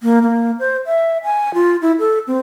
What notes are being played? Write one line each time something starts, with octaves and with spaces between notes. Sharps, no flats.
A#3
A#3
C5
E5
G#5
F4
E4
A4
C4